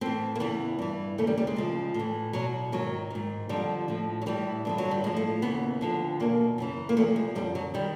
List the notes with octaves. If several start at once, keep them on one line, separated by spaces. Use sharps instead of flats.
A2 E3 C4
A#3
E2 C#3 E3 B3
G2 E3
D#2 C#3 E3 A3
G3
G3
G#3
D2 C#3 F3
A2
E3
E2 B2 F#3
G#2 D#3 F#3
G#2 D#3
F2 D3 F3 G3
A2 F3
F#3
A2 E3 G3
G2 D3 F3
F#3
G3
A2 F3 G#3
A3
D#2 C#3 E3 B3
D2 D3 F3
E2 B2 A#3
F#2 C#3 E3
A#3
E2 C3 F3 A3
G#3
F#2 D3 F3 G3
F#3
D#3 G3